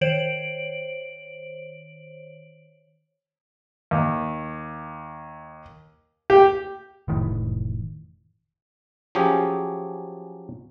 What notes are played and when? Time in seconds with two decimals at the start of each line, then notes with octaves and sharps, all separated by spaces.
0.01 D#3 C5 C#5 D7 F#7
3.91 D#2
6.30 G4
7.08 F1 A2 D#3 E3
9.15 F3 F#3 C#4 G4 G#4